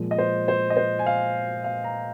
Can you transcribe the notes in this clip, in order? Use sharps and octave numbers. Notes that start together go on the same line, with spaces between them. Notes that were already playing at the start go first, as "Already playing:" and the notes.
Already playing: A#2 F3 G#3
D#5
C5
C5
D#5
C5
G#5
F5
F5
A#5